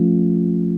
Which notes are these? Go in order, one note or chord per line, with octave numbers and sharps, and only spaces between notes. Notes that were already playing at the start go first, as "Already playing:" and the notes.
Already playing: F3 A3 C#4 F4